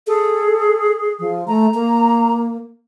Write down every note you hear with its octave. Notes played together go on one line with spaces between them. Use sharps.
G#4 A4
F3
A3 A#5
A#3